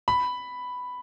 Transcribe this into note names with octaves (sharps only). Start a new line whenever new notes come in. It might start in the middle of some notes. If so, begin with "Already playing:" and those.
B5